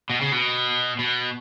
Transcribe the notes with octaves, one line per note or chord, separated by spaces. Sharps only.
B2
C#3
B2
B2